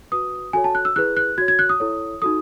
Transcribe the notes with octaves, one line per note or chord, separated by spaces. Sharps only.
F#4 B4 D#6
F#4 A4 C#5 G#5
A5
F#6
E6
E4 G#4 B4 F#6
F#6
F#4 C#5 G#6
G#6
F#6
D#6
E4 A4 C#5
D#4 F#4 A4 D#6